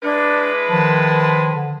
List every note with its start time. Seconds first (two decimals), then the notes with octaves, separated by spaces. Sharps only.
0.03 G#3 D4 E4 B4
0.69 D#3 F3 A5
1.55 D3